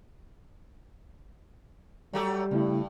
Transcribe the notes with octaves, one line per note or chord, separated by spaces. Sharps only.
F#3 G3 A3 G4
G2 C#3 A3 E4